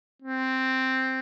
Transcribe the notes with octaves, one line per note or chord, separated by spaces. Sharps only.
C4